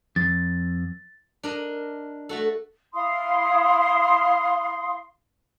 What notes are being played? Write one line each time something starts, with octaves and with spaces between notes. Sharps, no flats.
F2 A6
D4 A#4 D#5
A3 F#4 A4
E4 F5 C6 D#6